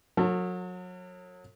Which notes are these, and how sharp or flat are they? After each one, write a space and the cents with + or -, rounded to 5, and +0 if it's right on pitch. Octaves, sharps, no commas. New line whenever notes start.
F#3 -30 A4 +45